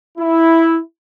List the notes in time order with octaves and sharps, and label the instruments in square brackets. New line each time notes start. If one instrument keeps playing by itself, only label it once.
[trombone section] E4